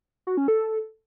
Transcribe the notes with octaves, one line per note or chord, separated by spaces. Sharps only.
F#4
C#4
A4